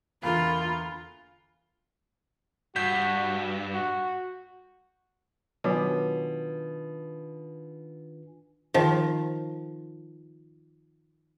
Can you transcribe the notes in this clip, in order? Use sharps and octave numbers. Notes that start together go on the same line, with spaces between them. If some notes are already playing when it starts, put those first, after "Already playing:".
E2 D3 A#3 F4 B5
G2 F#4 G6 B6
F#4
B2 D#3 F#3 D4 F4 B4 C#5 G#5
D#3 F3